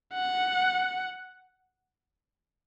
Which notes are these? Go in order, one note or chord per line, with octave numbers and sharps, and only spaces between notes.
F#5